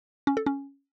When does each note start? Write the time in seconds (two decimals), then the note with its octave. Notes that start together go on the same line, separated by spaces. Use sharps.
0.27 C#4
0.37 A4
0.46 C#4